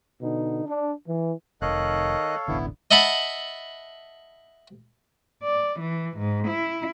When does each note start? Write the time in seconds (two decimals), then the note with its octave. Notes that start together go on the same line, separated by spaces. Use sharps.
0.21 B2 D3 D#4
0.66 D4
1.06 E3
1.62 F1 D#3 A4 C#5 D#5 F5 F#6
2.48 E1 A1 D3 B3 E4
2.91 D#5 E5 F#5 A5 B5
5.43 D5
5.80 E3
6.17 G#2
6.47 E4